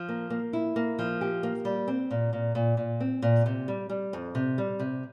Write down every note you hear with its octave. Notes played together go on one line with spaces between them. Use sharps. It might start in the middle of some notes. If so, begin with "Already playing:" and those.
Already playing: F3
A#3
A#3
E4
A#3
F3
G4
A#3
G3
C4
A#2
A#2
A#2
A#2
C4
A#2
C3
G3
G3
F2
C3
G3
C3